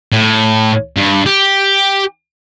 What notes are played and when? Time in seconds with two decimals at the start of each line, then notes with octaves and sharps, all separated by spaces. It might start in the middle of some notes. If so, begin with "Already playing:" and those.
0.12 A2
0.96 G2
1.26 G4